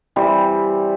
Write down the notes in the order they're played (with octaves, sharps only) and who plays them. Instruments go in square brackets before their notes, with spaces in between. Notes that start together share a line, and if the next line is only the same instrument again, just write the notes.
[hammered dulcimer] E3 G3 C4